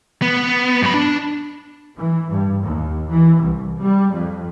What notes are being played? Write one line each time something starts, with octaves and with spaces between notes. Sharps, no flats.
B3
F#2 B5
D4
E3
G2
D#2
E3
C2
G3
F2